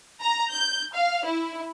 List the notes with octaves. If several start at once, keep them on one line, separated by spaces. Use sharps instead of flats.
A#5
G6
F5
E4